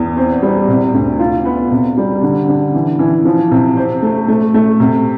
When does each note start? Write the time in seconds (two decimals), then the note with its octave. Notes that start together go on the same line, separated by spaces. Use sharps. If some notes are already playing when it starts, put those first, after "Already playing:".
Already playing: E2
0.17 C4
0.43 G3
0.68 C3
0.94 D2
1.19 F4
1.45 B3
1.71 C3
1.97 G3
2.22 D3
2.48 D3
2.74 E3
2.99 E3
3.25 F3
3.51 C3
3.77 C4
4.02 A3
4.28 A3
4.54 A3
4.80 C3